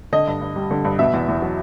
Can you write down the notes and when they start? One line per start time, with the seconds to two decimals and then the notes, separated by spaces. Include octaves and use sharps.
0.13 D3 D#5
0.27 G2
0.41 G2
0.56 G3
0.71 D3
0.85 G2
0.99 B2 E5
1.13 E2
1.28 E2
1.42 F#3